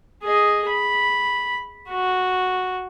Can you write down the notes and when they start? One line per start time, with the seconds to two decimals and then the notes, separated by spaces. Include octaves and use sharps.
0.23 G#4 D#5
0.69 B5
1.89 F#4